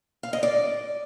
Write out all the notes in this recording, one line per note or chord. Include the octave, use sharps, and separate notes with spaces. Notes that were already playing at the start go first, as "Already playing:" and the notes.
F5
D#5
D5